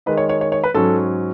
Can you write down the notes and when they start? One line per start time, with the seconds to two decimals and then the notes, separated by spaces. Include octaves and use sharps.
0.06 D#3 G#3 D#4 B4
0.17 C#5
0.29 C#5
0.41 C#5
0.52 C#5
0.64 B4
0.74 G#2 F#3 C#4 A4